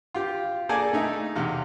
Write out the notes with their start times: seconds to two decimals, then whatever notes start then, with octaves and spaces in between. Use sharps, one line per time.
0.14 F4 G4
0.69 A#3 G#4 A4 D5 G#5 A5
0.93 A3 D#4 E5
1.36 E2 C3 F5